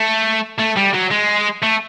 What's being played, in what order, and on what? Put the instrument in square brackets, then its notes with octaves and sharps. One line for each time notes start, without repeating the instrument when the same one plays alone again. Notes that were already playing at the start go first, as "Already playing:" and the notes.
Already playing: [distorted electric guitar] A3
A3
G3
F#3
G#3
A3